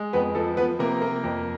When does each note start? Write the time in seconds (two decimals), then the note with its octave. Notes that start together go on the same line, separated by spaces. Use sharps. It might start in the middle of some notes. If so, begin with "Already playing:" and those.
Already playing: G#3
0.13 F2 B3 B4
0.35 F3 A4
0.57 F3 B3 B4
0.79 C3 A#3 A#4
1.02 A#3
1.24 F2